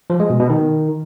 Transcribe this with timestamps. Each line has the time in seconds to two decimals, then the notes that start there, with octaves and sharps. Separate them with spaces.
0.10 F3
0.20 G#3
0.30 B2
0.40 B2
0.50 D#3